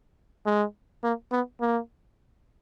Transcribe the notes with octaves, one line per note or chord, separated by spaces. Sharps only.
G#3
A#3
B3
A#3